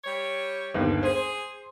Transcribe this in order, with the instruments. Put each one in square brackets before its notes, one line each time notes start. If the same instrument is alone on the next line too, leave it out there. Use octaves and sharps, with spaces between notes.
[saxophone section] G3 C#5
[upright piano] G1 D#2
[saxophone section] G#4 [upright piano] C5